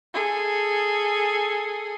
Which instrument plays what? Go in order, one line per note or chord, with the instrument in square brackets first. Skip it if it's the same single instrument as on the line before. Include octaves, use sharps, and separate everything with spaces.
[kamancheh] G#4 A4